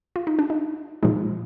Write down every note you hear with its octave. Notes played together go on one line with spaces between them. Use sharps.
F4
D#4
D4
D#4
A#2 F3 G#3 D#4